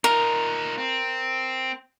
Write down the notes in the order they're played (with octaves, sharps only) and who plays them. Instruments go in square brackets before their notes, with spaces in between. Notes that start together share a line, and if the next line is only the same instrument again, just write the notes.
[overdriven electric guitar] D#4 F4 [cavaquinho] A#4
[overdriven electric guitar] C4